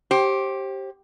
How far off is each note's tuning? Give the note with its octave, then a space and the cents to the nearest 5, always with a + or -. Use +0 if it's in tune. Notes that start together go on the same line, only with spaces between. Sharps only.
G4 -10 C5 +30